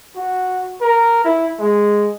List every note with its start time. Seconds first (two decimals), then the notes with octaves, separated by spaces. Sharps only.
0.16 F#4
0.81 A#4
1.25 E4
1.59 G#3